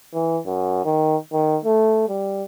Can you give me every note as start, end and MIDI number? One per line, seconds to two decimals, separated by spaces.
0.14 0.39 52
0.46 0.85 42
0.85 1.16 51
1.33 1.57 51
1.65 2.07 57
2.09 2.43 55